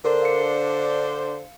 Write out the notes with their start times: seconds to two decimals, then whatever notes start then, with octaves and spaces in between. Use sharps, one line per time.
0.05 D3 D4 A#4 C5
0.22 F5 C#7